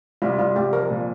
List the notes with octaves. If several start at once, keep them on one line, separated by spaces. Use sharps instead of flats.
C2 F4
C2 F4
C2 G4
F3 A#4
A#2